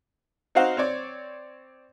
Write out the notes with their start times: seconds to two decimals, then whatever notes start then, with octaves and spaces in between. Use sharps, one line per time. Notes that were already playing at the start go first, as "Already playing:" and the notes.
0.55 C4 D#4 F#4 C5 F5 F#5
0.77 C4 C#5 D5